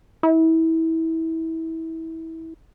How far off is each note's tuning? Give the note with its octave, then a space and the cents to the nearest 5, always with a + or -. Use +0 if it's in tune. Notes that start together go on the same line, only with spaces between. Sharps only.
E4 -25